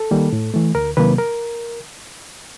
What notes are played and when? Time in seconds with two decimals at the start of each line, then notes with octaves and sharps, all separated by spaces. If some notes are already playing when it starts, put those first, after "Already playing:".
Already playing: A4
0.11 D#3 G3 A#3
0.33 A2
0.54 E3 A3
0.75 D2 A#4
0.97 C3 D#3 F#3 A#3 B4
1.18 A#4